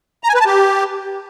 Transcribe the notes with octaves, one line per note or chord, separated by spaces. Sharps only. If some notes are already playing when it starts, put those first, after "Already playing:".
A#5
G#5
B4
A5
G4